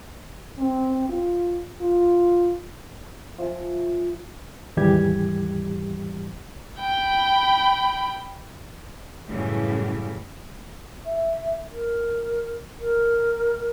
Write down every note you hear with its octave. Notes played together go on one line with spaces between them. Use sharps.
C4
F4
F4
F3 E5 G#5
D#2 G#2 E3 G3 G4 G#6
G5 B5
F#2 A2 C#3 E3 F#3 G3
E5
A#4
A#4